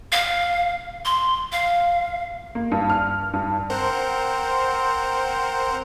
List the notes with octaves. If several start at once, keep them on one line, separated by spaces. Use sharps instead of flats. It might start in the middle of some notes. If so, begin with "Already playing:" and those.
F5
C6
F5
A#3
G2
F6
G2
C4 A#4 C5 F#5